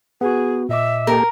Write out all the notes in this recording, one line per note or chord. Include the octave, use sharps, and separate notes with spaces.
B3 F#4 G#4
A#2 D#5 E5 D6
A#3 G4 A4 A#4